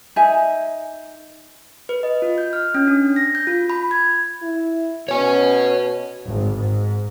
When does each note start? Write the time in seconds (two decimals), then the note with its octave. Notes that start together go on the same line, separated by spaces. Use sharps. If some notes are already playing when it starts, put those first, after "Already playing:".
0.16 D#4 E5 G#5
1.89 B4
2.03 D#5
2.22 F4
2.38 G6
2.53 F6
2.75 C#4
2.87 D4
3.16 A#6
3.35 G6
3.47 F4
3.70 B5
3.91 G#6
4.42 E4
5.09 B2 C#5 G#5
6.27 G#1
6.58 G#2